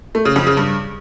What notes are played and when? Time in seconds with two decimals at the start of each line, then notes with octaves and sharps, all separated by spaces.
0.15 A3
0.25 C#3
0.36 F2
0.47 C#3
0.57 G2